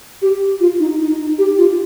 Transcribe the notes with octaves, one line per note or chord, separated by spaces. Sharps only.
G4
F4
D#4
D#4
D#4
G4
F4